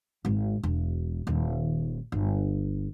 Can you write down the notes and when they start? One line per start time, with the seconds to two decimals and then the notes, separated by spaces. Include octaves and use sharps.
0.25 G#1 G#2
0.63 E1
1.27 D#1 D#3
2.12 G1